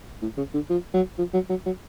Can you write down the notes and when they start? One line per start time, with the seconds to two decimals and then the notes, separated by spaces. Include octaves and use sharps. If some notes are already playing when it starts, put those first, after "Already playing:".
0.22 A2
0.37 C#3
0.54 D3
0.70 F3
0.94 F#3
1.18 F3
1.34 F#3
1.50 F#3
1.66 F#3